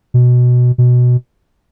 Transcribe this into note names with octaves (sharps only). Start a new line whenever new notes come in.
B2
B2